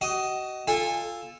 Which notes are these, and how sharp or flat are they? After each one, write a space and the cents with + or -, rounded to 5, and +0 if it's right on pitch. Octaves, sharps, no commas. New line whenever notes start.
F#4 +35 D#5 +5
F4 +0 A4 +0 G#5 -30